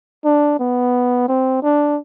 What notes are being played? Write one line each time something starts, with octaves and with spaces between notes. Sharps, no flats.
D4
B3
C4
D4